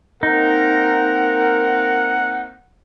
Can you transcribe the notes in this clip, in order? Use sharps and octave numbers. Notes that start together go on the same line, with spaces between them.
A#3 C4 D#4 A#4 F#5